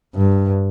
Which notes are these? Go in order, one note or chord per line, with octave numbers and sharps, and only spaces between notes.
G2